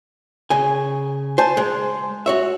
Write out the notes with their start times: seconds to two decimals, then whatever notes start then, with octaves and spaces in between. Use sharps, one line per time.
0.50 C#3 G#5
1.38 C5 G#5 A5
1.57 G#3
2.26 F#4 C#5 E5